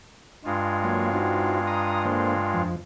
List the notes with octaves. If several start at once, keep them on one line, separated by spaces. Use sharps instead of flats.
G2 G#3 F4
F#3 A#3 C#5
C4 D#4 F#4
A#5 D#6
D3 A#3 C5
F2 F3